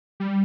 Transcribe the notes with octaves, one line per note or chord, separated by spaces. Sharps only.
G3